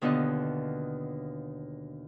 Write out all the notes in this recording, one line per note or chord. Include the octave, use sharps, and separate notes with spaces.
D#2 B2 D3 F4 D#5 F#6